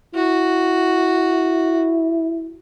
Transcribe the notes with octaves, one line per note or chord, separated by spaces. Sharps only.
E4 F#4